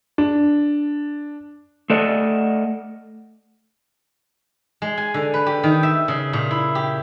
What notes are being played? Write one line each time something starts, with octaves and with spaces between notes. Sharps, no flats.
D4
A3 A4 D5 D#5 F#5
G#3
G#5
D3
B4
G4
D#3
E5
C#3
A#2
E4
G4